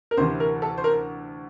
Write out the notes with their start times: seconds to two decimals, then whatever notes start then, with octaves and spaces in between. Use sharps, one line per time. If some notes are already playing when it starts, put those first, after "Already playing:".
0.11 A#4
0.17 D2 C3 E3 C5
0.40 A#4
0.62 A4
0.78 C5
0.84 A#4